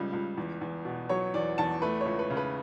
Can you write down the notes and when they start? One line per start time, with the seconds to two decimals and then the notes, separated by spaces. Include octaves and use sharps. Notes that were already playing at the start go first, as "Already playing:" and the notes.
Already playing: C#2 C#3 G3
0.13 C#2
0.37 E2
0.61 E2
0.85 B2
1.09 F#3 C#5
1.34 E2 D5
1.58 E2 A5
1.82 A3 B4
2.01 C#5
2.06 C#2
2.19 B4
2.30 C#3
2.37 B4